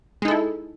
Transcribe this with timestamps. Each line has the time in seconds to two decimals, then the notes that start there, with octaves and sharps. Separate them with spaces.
0.22 G#3
0.25 D#4
0.28 A4
0.31 E4